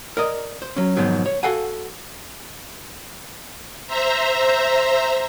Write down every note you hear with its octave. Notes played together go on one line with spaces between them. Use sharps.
A#4 D5 D#5
C5
F#3 C#4
F2 G#2 B2 D#3 F#3
C#5
F#4 A4 F5 F#5 G#5
C5 E5 A#5